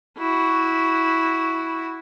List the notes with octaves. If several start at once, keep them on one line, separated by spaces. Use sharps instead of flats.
E4 F#4